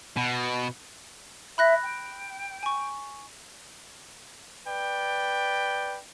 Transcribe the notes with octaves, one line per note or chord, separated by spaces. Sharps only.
B2
E5 B5 F#6 A#6
G5
G#5 C#6
B4 D5 G5